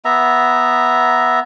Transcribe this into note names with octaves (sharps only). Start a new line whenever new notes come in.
B3 E5 A#5